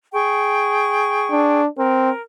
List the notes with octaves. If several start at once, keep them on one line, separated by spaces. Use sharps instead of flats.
G#4 G5 C#6
D4
C4 A#4